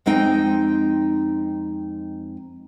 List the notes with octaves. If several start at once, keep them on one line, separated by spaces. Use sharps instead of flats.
F2 G#3 C4 D#4 G5